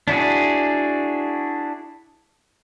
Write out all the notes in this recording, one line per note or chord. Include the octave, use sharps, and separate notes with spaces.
D4 E4 F#4 G#4